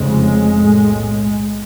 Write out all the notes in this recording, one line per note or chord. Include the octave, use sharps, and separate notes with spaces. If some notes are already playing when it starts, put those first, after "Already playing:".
Already playing: F1 F2 C#3 G#3
B1 A2